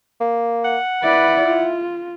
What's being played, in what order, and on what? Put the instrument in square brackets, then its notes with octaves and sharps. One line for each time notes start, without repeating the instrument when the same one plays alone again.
[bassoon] A#3
[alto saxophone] F#5
[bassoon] E4 [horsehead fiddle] B4 D5
[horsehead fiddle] F4